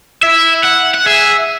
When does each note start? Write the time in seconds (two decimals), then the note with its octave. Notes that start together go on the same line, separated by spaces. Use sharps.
0.23 E4 E5
0.64 F#5
0.94 F#5
1.06 G#4 E5